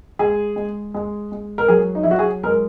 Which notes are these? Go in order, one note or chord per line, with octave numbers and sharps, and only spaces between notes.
G#3 G#4
G#3
G#3
G#3
A#4
F#3 G#4
D#4
E4
F#3 F#4
G#4
G#3 A#4